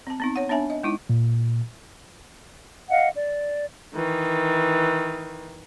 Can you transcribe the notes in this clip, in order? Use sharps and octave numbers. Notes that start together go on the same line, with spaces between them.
C4 A5
B3 C4 D#4
C#5 F#5
B3 D4 C#5 E5 G#5 A5
D#5
G#3 D#4 E4
A#2
D#5 F5 F#5
D5
D#3 E3